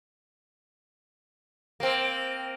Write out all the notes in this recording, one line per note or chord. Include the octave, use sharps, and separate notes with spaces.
A#3 C4